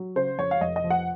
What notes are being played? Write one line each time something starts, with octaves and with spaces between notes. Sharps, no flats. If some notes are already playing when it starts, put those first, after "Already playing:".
Already playing: F#3
C#3 C5
F2 C#5
F5
F1 D#5
D#5
F3
F#5